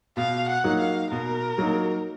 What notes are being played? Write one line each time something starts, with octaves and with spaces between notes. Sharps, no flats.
B2 F5
F#5
F#3 A#3 D#4
F5
B2 A#4
F#3 A#3 D#4